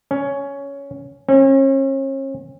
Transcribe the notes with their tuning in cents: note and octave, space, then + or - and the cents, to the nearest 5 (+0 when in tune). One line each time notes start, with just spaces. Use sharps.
C#4 +10
C#4 -40